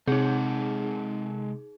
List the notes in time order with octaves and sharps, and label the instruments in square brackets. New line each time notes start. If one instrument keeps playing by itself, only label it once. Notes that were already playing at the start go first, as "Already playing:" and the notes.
[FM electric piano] C3 [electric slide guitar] G#3 A4 F#5 [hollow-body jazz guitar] C4 [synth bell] D#4 G#4